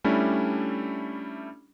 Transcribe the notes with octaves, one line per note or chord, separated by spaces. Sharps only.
G3 A3 C#4 D4 E4